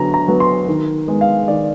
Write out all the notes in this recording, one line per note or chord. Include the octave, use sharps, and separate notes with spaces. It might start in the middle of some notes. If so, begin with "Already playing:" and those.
Already playing: D3 F#3 B3 A#5
A#5
F#3 B3
C6
D#3
G#3 B3
F5
D#3 D5